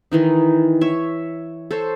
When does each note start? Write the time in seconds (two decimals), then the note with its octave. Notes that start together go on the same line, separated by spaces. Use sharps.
0.12 D#3 E3 D#4
0.81 C#5 E5
1.71 A4 C5 C#5